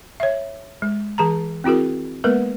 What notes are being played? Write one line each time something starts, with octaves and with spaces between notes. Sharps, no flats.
C#5 E5
G#3
E3 G#4 A5 A#5
C4 E4 F#4 G#4 A#4
G#3 A#3 B3 A#4 B4